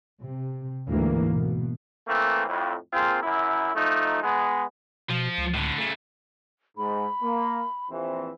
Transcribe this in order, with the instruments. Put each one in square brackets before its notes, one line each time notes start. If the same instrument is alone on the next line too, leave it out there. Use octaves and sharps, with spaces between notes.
[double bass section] C3
D2 G#2 E3 A#3
B2
[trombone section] E3 A3 A#3 C4
F2 A2
A#3 C4 F4 G#4
F#2 E4
F3 A3 D#4
G#3 B3
[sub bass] B2 [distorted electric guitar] F3
[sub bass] C#2
[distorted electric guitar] A2 D3
C#3 A3
[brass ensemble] G#2 [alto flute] B5
[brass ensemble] A#3
A#1 E3 C4